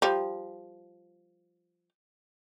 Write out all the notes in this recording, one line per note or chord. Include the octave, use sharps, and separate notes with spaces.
F3 G3